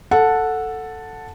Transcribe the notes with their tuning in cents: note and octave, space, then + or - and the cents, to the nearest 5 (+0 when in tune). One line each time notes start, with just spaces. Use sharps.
A4 +5 F#5 -10 A5 +0